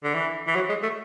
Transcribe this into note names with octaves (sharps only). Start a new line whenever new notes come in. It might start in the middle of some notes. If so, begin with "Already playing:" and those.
D3
E3
E3
F#3
G#3
A3